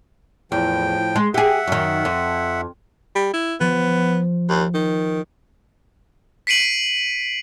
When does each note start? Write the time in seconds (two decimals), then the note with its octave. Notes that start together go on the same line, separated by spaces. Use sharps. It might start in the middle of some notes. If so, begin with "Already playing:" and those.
0.52 E2 A2 F3 G5
1.16 G#3
1.34 G4 G#4 E5 F#5
1.68 F#2 D#3
2.05 F2
3.15 G3
3.33 E4
3.60 F3 B3
4.49 D#2
4.74 D#3
6.47 B6 C7 D7 D#7 F#7